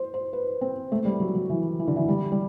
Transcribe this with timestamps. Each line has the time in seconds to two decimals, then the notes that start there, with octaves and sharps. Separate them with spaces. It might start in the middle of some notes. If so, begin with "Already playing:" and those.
Already playing: C5
0.14 C5
0.33 B4
0.61 C4
0.92 A3
1.05 G3
1.20 F#3
1.35 F#3
1.49 E3
1.79 E3
1.87 D3
1.96 E3
2.08 G3
2.32 G3